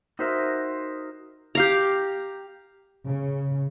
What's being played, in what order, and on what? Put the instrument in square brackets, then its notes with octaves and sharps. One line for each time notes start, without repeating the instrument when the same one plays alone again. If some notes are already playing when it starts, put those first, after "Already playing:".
[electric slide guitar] D#4 F#4 A#4 C5 D#5 E5
[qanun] G4 F5 A#5
[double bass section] C#3